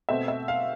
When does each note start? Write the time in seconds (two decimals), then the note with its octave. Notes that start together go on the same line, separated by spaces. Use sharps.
0.09 B2 A3 C4 E5
0.28 E5
0.48 F5